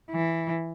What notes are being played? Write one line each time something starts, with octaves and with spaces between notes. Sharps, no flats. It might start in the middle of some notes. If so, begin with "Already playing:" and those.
E3